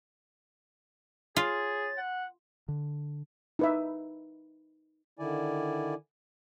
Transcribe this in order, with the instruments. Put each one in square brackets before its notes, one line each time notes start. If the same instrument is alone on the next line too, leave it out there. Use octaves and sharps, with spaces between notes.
[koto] F4 [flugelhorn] G#4 [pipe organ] C#5 A6
[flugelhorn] F#5
[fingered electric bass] D3
[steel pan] D#4 B4 E5
[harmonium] D3 D#3 E4 D5 G#5